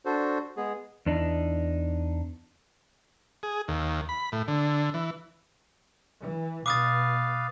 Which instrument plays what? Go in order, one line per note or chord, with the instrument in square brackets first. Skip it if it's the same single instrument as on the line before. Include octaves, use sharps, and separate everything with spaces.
[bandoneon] D4 F#4 A4 C5
G#3 B3 G#4
[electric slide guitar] E2 D4 D#4
[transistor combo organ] G#4
D#2
B5
A2
D3
E3
[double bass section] E3
[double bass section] B2 [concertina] B4 F5 [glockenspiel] D6 D#6 A6